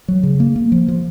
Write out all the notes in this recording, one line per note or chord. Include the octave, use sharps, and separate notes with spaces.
F#3
C#3
A#3
A#3
F3
F3